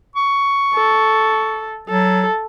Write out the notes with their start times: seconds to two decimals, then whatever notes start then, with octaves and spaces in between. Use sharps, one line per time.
0.16 C#6
0.74 A4
1.89 F#3 A4